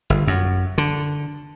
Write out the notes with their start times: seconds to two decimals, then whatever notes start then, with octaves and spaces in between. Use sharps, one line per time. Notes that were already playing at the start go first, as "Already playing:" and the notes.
0.10 G1
0.27 F#2
0.78 D3